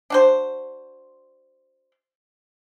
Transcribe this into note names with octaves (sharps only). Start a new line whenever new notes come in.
D4 F#4 C5